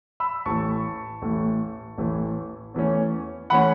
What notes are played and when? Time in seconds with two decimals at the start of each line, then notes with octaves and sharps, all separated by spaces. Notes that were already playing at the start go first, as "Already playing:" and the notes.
0.20 B5 E6
0.45 A1 A2 E3 A3 A5 C#6
1.22 A1 A2 E3 A3
1.98 A1 A2 E3 A3
2.74 E2 E3 A3 C#4
3.50 E3 A3 C#4 F#5 B5